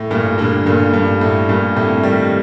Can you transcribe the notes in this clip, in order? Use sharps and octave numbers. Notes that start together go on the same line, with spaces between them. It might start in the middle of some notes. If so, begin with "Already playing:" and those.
Already playing: A2
G2 A#2
A#2 D3
G2 A#2
G2
A2
G2 A#2
A2 C3
D#3 G3